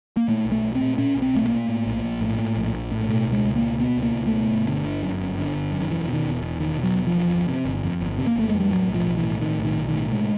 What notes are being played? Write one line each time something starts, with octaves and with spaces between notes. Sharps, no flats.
A#3
A#2 A3
B1
A3
B1
C4
A#2
A#2 C#4
B1
C4
B1 A3
A#3
A#2
A2
A#1
A#1
A2
A2
A#1
A#1
A2
B2 A3
C#2
G#3
C#2
A#3
B2
B2 B3
C#2
A#3
C#2
A3
B2
G1
D3
G1
F#2
G1
D3
G1
F#2
D#3
E1 E3
B2
D#3
E1
E2
E1 D#3
B2
F#3
E1
F3
E2
G1
C3
G1
F2
G1
C3
A#3
G1 A3
F2 G#3
G3
A2 F#3
B1
F3
B1
E3
A2
A2 D#3
B1
D#3
B1
D#3
A2
C3 G#3